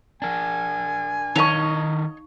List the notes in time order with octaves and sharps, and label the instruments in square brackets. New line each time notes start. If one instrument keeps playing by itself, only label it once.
[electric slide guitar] D4 A#4 [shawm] G#5
[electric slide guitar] D#3 D4 A#4 [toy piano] D#4 F5 C#6 [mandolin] C#5 D#5